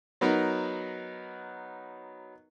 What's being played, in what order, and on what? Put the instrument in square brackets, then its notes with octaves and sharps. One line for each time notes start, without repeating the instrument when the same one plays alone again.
[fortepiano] F#3 B3 D#4 A#4 B4